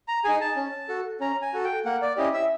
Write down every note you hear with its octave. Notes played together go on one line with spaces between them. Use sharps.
A#5
D#4 G#4 G#5
A5
C#4
F#4 A4
C#4 A#5
G#5
F#4 A4
G5
A#3 F#5
D5
C#4 E4 G4 D#5
E5